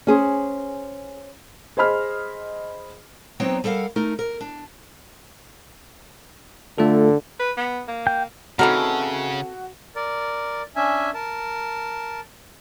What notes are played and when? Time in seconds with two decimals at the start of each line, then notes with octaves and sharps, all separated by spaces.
0.07 C#4 G#4 C5
1.77 G#4 C5 D#5 B5 F6
3.40 F#3 B3 C4 D#4 C#5 G5
3.64 G3 A4 A#4 F5 F#5
3.96 A3 D#4 A#4
4.19 A#4
4.41 D4
6.78 D3 A3 F4 A4
7.39 B4
7.57 B3
7.88 A#3
8.07 G5 G6
8.59 C#3 E3 C4 D#4 F#4 A4 A#4
9.95 A#4 D5
10.76 C#4 D4 E5 G#5
11.14 A#4 A5